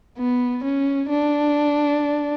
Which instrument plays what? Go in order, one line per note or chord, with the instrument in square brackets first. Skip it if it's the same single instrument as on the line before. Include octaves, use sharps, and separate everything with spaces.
[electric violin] B3
C#4
D4